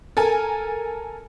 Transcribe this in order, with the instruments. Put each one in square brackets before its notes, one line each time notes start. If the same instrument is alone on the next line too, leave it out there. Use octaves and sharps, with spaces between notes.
[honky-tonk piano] A4 A#4 G#5